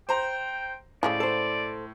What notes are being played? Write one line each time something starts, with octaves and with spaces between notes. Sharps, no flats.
C5 G5 A#5
A2 C#3 F3 G#3 D5
A4 C5